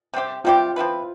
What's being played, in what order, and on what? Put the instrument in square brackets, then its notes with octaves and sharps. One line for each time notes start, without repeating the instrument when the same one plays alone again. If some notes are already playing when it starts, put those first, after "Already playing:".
[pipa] C3 G3 C4 G4
[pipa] C3 G3 C4 G4 [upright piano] F4
[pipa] F3 C4 E4 B4